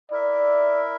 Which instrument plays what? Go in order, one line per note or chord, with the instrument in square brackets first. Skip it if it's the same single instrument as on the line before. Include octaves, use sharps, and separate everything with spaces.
[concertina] E4 A#4 E5 [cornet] D5